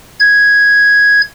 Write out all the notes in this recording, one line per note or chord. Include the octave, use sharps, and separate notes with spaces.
G#6